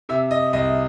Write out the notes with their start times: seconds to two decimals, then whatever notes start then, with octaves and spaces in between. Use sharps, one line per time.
0.09 C3 E5
0.31 D#5
0.53 C2 D#5